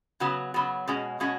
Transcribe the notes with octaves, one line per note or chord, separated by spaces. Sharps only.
C#3 F#3 B3 F#4
C#3 F#3 B3 F#4
B2 G#3 C#4 F#4
B2 G#3 C#4 F#4